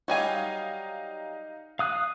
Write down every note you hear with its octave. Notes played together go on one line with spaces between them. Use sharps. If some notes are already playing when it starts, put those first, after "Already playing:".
F#3 G3 D#4 D#5 F5 G#5
F5 D#6 F#6